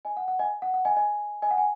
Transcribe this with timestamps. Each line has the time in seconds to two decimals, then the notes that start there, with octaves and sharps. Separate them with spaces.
0.05 D#5 G#5
0.17 F#5
0.28 F#5
0.39 D#5 G#5
0.62 F#5
0.74 F#5
0.85 D#5 G#5
0.96 D#5 G#5
1.42 D#5 G#5
1.51 F#5
1.58 G#5